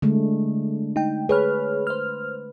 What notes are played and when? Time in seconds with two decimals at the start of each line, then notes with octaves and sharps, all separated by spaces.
0.02 D3 G#3 A3
0.96 D#4 G5
1.29 G#4 B4 C#5 F6
1.87 C5 F6